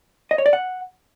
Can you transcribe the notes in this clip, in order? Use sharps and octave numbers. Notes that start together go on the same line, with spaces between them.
D#5
C#5
D5
F#5